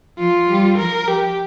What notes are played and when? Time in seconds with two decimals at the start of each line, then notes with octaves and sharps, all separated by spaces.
0.18 F3 F4
0.48 G3
0.77 F3 A#4
1.08 G4